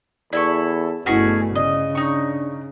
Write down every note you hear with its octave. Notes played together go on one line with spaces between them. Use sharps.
E2 E4 A4 D5 C#6
G1 B2 A3 C#4 E4 F#4 G#4 F#5
C#3 D5 D#5
D4 D#4 C#6